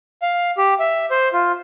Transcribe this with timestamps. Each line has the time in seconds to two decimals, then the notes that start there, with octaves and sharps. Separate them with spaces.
0.22 F5
0.58 G4
0.80 E5
1.11 C5
1.33 F4